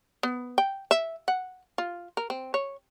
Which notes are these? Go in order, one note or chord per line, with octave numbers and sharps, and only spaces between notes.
B3
G5
E5
F#5
F4
A#4
C4
C#5